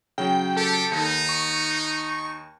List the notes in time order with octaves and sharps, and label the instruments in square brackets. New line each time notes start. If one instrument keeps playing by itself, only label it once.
[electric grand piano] C#3 F#3 [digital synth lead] G5
[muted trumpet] G4 [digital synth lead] A4
[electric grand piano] D#2 [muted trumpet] D#4
[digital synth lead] C#6